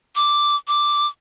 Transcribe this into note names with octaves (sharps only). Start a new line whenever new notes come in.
D6
D6